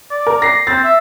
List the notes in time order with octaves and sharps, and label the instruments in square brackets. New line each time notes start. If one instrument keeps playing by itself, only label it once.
[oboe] D5
[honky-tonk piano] A#4
A#6 C7
[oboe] C4 [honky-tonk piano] A6
[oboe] E5